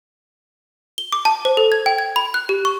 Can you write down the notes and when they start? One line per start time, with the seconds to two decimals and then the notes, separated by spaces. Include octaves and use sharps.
0.98 G7
1.12 D6
1.25 A5
1.45 C5
1.57 A4
1.72 G#6
1.86 G5
1.98 G#6
2.16 B5
2.34 F#6
2.49 G4
2.65 C#6